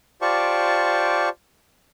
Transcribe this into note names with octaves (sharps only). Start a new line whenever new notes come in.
F4 G4 C5 D5 A5 C#6